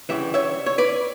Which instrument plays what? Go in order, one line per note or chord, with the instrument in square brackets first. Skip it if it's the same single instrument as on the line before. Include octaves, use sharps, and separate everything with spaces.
[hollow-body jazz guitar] D2 C#3 E3 G3 E5
C#5 E5
C#5
B4 D5